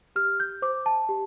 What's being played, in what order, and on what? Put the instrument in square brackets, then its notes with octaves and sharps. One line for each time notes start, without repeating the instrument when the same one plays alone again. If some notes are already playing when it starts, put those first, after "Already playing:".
[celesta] G4 F6
G6
C5 D6
A5
G4